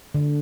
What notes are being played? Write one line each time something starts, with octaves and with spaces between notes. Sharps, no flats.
D3